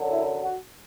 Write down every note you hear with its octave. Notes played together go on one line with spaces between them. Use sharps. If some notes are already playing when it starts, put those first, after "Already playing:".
Already playing: F#2 D3 F#3
E4
F#4